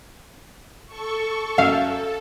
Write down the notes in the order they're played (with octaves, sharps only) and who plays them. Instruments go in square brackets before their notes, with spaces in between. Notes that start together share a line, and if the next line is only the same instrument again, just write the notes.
[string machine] A4 C#6
[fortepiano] F#2 E5 [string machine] A4 [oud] F5